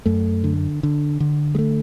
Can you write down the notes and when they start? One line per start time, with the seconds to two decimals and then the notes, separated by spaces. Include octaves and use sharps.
0.06 F#2 A3
0.44 D3
0.83 D3
1.20 D3
1.55 G#3
1.59 A3